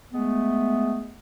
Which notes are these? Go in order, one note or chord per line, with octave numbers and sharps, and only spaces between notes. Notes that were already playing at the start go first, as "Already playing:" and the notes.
G#3 A3 B3